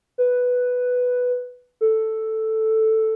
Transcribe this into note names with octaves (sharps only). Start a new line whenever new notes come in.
B4
A4